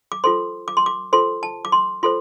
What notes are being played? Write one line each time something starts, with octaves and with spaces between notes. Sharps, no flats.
D6
F4 A4 C5 C6
D6
C6
D6
F4 A4 C5 C6
A5
D6
C6
F4 A4 C5 C6